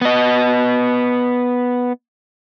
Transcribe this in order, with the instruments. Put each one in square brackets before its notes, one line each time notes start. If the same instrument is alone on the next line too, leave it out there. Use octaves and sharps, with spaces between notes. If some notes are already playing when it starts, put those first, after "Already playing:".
[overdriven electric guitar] B3 D#5